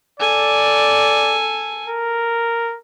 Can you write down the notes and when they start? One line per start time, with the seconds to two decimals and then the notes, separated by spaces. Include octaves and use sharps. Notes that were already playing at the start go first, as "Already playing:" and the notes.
0.20 A4 D5 G#5
1.88 A#4